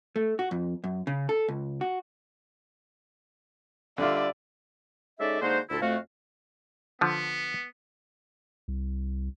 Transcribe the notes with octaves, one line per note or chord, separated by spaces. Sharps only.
A3
F#4
F2
F#2
C#3
A4
C#2
F#4
D3 G3 F4 D5 E5
G#3 C#4 D#4 A4 D5 E5
D3 G#3 A#3 D#4 F#4 C5
D2 A#2 E4 A4
F2 A3 F#4 F5
D3 F3 B3
C2